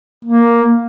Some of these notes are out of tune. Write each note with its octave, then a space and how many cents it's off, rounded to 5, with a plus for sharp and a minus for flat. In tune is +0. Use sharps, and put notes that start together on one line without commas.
A#3 +5